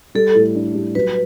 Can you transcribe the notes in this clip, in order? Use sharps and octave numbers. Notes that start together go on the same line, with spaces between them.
G3 A4
A2
D4
G3
F#3 B4